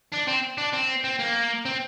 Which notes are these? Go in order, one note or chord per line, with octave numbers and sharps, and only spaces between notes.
D4
C4
D4
C4
C4
A#3
C4